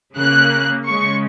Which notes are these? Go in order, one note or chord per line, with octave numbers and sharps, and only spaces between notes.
C#3 A#3 F#6
C#3 G#3 C#6